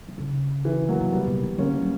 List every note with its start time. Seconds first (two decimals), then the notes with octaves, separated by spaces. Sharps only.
0.08 D3
0.18 C#3
0.65 E3
0.88 F#3 A#3
1.00 B2
1.12 C#3 G3 B3
1.27 B2
1.43 E3
1.58 D3 A#3 C#4
1.82 F#3